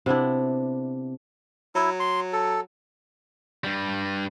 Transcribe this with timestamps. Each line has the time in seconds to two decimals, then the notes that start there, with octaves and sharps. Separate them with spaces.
0.06 C3 B3 D4 E4
1.75 F#3 E4
2.00 C6
2.33 A4
3.64 G2 G3